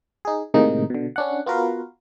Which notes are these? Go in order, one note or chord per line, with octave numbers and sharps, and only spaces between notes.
D#4 G#4
A2 C3 D#3 G#3 A#3 D#4
B2 D3
C#4 D4 F#5
B3 F4 F#4 A#4 B4 F5